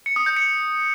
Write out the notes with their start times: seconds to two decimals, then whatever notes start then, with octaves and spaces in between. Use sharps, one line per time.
0.06 C#7
0.16 D#6
0.26 G6
0.36 C#7